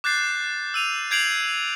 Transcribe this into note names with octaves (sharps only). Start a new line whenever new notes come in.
D6 F#6 G6 A6 C7
E6 D#7 F7
G6 G#6 C7 D7 F7 F#7